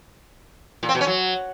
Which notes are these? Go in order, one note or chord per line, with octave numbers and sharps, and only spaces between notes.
A#2
C4
B2
C#4
F#3